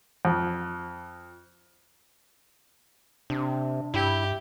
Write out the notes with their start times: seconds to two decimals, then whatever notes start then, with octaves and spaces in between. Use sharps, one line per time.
0.25 F2
3.30 C3 D4
3.94 G2 E4 G4